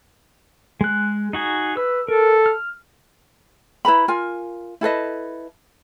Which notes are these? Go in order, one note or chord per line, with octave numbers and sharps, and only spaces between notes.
G#3 F#6
D#4 F#4 G#4
B4 E6
A4 A#4
F6
E4 B4 A#5 B5
F4 A#4 G#5
E4 A4 B4 D#5